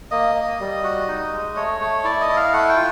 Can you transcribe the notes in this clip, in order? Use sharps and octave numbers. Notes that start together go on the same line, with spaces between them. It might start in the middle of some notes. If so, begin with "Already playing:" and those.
A#3 D#5
A#3
G3
F#4
D#4
G#3
A3 C#5
A3
E4 D5
D#5
E4
F5
A3 F#5
G5
F4